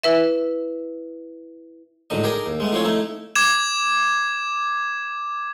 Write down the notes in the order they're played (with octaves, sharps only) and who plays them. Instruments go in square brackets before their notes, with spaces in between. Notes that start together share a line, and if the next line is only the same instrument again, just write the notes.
[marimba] E4 B4 E5
[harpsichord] A1 G#2 D3 F#3 D#5
G4 G#4 A#4 G5 A#5
D#2
G#3 A3 B3
E3 F3 A3 C4 C#4 C#5
A3 D#4 E4
[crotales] D6 G#6 E7